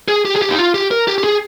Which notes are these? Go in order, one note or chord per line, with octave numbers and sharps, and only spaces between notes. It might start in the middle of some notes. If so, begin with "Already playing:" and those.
G#4
G4
G#4
G4
D#4
F4
G4
A#4
G4
G4
G#4